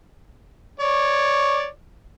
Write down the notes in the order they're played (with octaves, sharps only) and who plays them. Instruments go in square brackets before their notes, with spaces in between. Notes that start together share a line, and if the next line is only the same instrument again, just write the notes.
[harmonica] C#5 D5